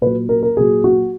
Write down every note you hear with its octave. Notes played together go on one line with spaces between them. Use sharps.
A#2 F#3 B4
A#4
A#4
A#2 F#3 G#4
F#4